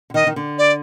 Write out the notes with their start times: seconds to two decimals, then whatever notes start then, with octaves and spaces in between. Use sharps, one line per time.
0.10 D3
0.14 D#3 D#5
0.27 D#3
0.36 D3
0.58 D5